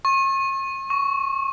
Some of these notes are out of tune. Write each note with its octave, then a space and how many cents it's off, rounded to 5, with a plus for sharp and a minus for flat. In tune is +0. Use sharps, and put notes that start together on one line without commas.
C#6 -40
C#6 +10